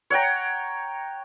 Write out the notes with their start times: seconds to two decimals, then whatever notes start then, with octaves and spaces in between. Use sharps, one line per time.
0.10 C#5 F#5 G5 A#5